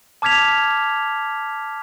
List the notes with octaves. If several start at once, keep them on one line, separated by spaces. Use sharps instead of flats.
A5 D6 F6 G#6 B6 F7